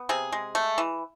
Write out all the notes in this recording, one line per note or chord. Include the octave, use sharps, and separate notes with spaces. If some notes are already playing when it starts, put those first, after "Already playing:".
Already playing: B3
C3 G#4
G#3
A3
E3